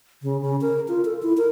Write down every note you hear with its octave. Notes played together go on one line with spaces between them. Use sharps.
C#3
C#3
A#4
F4
A4
E4
A#4